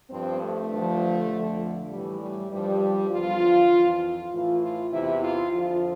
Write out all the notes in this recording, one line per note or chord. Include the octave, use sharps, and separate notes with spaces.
G2 F3 C4
A3
G2 D3 F3
F2 D3 F3
A2 E3 G3
G3
G2 F3 G3
E2 D3 F3 F4
F2 E3
A2 E3 F4
F4
E2 C3 E3 E4
F4
F2 D3 F3 F4